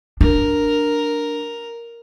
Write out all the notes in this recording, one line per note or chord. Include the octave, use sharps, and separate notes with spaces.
D4 A#4